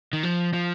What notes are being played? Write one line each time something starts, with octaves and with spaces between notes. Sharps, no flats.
D#3
F3
F3